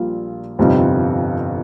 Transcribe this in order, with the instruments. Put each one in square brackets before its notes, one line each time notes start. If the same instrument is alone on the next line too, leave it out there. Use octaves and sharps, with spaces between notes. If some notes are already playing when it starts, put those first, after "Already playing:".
Already playing: [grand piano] A#1 A#2 G3 A#3 F4
G1 F2 C3 G3 D#4